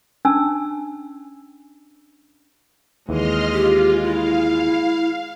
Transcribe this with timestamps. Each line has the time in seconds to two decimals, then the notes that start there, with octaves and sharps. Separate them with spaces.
0.25 C#4 D4 G#5 A5 E6
3.09 D#2 E3 G#3 D#5 C6 F6
3.53 F4 G4
4.05 E4 F5